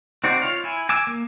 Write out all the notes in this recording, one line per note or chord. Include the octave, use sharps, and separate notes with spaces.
C4 D#4 F#4 C5 D5
F4 C#5 F5
E4 G#5
G#5 D6 E6
A#3